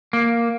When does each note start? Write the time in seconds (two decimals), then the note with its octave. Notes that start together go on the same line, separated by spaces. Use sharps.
0.13 A#3